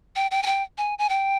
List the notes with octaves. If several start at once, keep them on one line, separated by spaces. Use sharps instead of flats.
G5
G5
G#5
G5
G#5
G#5
G5